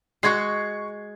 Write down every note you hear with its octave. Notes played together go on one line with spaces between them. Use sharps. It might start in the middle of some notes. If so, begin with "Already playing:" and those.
G#3 F#4 C#6 G#6 C7